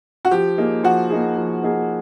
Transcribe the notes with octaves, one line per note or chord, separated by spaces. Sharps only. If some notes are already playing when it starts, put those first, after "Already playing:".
F#4
F3 G4
A#3 D#4 G#4
F3 F#4
A#3 D#4 G#4
F3
A#3 D#4 G#4